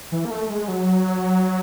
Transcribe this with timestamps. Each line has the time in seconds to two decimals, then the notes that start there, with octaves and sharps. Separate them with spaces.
0.12 E3
0.25 A#3
0.31 A3
0.49 G#3
0.68 F#3